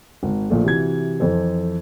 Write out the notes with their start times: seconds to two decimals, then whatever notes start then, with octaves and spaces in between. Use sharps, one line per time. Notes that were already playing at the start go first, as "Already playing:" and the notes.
0.23 G#1
0.50 A#1 A#2 A3
0.64 C3 E3 F#4 G#6
1.20 F2 E3 A4 C5